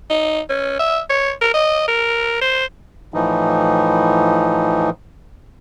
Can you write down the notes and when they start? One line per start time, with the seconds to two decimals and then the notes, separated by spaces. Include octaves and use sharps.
0.10 D#4
0.49 C#4
0.79 E5
1.09 C#5
1.41 A#4
1.54 D#5
1.88 A#4
2.41 C5
3.14 A2 E3 F3 D#4